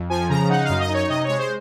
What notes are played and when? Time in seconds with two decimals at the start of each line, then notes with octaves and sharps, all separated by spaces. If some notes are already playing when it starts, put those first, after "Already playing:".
Already playing: F2
0.10 F3 G#5
0.29 C#3 A#5
0.49 D#4 F#5
0.64 F5
0.69 F#2
0.79 D#5
0.89 D#4
0.94 C#5
1.08 C3 D#5
1.24 G#3 C#5
1.38 C5